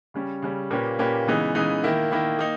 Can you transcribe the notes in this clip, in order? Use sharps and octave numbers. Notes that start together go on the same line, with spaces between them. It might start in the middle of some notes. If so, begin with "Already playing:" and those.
C#3 G3 C#4
C#3 G3 C#4
A#2 A#3 C#4 G4 B4
A#2 A#3 C#4 G4 B4
C#3 E3 G#3 B3 D#4
C#3 E3 G#3 B3 D#4
D#3 A#3 E4
D#3 A#3 E4
A#3 D#4